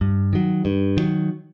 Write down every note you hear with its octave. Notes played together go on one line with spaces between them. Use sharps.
G2
D#3 F#3
G2
D#3 F#3